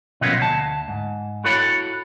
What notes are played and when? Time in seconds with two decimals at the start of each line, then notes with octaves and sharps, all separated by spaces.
0.21 B2 F3 F#3 A#3 B3 C#4
0.39 D2 A5
0.88 G#2
1.44 E4 F#4 A4 C#5 B5